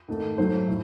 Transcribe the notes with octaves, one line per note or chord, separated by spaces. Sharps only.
G#2 D#3 A3
G#2 F#3 A3 C5
A2